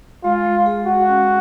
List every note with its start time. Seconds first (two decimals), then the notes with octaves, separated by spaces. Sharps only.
0.24 G#3 F4
0.46 G#3
0.66 G#4
0.87 G#3 F#4
1.09 C#4